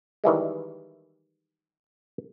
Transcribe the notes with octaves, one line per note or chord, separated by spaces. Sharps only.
D#3 E3 G3 G#3